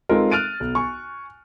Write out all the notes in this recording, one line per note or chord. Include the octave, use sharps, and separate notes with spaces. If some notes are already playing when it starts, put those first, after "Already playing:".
G#3 C4 D#4 F4 A4 A#4
F6 F#6 A6 D7 D#7
B1
G#5 C#6